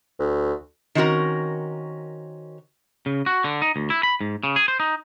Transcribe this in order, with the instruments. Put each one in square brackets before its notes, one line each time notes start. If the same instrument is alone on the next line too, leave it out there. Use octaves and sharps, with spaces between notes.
[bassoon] D2
[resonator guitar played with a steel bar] D#3 C4 C#4 F#4 A#4
[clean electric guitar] C#3
F#4
D3
D#4
D2
E4
B5
G#2
C#3
G#4
C5
D#4